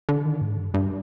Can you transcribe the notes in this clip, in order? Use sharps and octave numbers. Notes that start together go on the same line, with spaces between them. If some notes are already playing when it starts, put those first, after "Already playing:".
D3
D#3
G#2
G2
G2